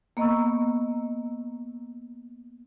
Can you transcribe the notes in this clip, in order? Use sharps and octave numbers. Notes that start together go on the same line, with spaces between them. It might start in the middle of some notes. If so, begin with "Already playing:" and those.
A#3 B3 D#5 A#5 C#6 E6